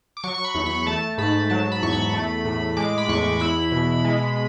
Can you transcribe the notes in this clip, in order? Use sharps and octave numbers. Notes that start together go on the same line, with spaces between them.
D6
F#3 C#6
C#6
B5
E2
B5
A3 A5
G#2 B5
F#3 A5
B5
E2 C#6
B5
A3
A2
G#3 D6
B5
E2 C#6
E4 B5
B2
G#3